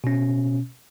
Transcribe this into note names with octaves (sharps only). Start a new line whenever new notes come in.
B2 C#4